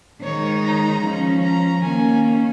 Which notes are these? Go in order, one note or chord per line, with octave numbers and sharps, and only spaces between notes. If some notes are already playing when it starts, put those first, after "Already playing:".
D#3 G#3 D#4 C#5
A#5
F3 C#4
A#5
D#3 A#3 C#4 G#5